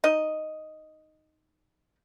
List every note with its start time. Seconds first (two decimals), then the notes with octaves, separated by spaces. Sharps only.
0.04 D#4 D#5